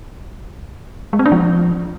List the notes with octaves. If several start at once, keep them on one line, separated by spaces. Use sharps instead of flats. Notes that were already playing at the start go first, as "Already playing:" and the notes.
G#3
C4
D4
F3